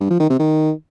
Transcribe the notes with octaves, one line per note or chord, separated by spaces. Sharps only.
G2
F3
D#3
C3
D#3